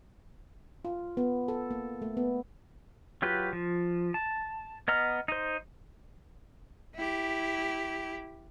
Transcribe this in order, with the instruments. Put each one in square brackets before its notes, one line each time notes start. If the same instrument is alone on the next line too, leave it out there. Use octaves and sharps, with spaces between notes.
[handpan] F4
B3
A4
A#3
A3
B3
[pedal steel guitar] F#3 F4 G4 B4
F3
A5
B3 D#5 A#5 F6
D#4 C5
[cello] E4 G4